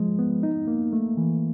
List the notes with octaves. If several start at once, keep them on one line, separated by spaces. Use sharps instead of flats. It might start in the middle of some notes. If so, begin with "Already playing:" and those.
Already playing: F3 G#3
B3
D#4
A#3
A3
E3